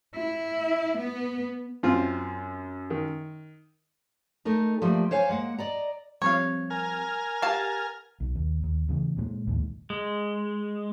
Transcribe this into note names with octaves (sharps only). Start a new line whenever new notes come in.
E4
B3
F#2 C4 F4
D#3
A3 D#4 A#4
F3 G3 A3 A#3
C5 C#5 F5 G#5
G#3 A#3 F#5
D5 D#5 A#5
F3 G3 C4 C#5 F5
A#4 G#5 F6
G4 F5 F#5 A5
B1
D#2
D#2
E2 C#3 E3
A#2 F#3 G#3
D1 A#1 D#2 G#2
G#3